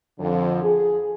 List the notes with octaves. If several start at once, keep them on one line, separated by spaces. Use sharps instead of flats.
F2 D3 F3
G#4